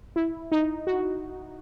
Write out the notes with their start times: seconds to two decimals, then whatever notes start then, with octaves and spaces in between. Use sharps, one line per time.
0.16 E4
0.52 D#4
0.87 F#4